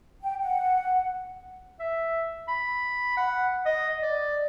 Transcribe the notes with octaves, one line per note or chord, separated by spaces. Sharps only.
G5
F#5
E5
B5
F#5
D#5
D5